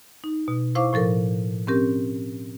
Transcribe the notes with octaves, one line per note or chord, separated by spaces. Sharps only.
D#4
B2
E4 C5 F5 C#6 D6
A2 F3 A4 A#4
C4 C#4 G4 A#4